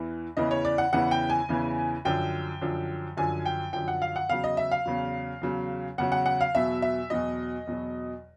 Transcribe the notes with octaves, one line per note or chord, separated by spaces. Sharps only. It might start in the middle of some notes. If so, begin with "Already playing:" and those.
Already playing: E2 E3
E2 C#3 E3 D#5
C#5
D5
F#5
E2 C#3 E3 F#5
G5
G#5
E2 C#3 E3
F#2 D3 F3 G5
F#2 D3 F3
F#2 D3 F3 G#5
G5
F#2 D3 F3 G5
F#5
F5
F#5
E2 C#3 F#3 F5
D#5
E5
F5
E2 C#3 F#3
E2 C#3 F#3
E2 C#3 F#3 F#5
F#5
F#5
F5
E2 B2 F#3 E5
E5
E2 B2 F#3 D#5
E2 B2 F#3